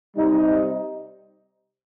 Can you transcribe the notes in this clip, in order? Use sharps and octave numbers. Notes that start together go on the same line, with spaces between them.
C3 G3 D#4